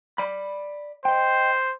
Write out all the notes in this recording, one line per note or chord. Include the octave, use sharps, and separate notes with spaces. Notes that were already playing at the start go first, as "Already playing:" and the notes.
D5 B5
C5 D#5 G5